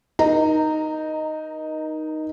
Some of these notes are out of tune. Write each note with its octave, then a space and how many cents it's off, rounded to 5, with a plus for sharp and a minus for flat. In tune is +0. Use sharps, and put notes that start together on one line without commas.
D#4 +0 A#4 +30 A#5 -20